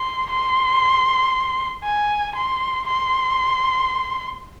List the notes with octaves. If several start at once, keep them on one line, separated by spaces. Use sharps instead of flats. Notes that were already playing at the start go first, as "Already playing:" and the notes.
Already playing: C6
C6
G#5
C6
C6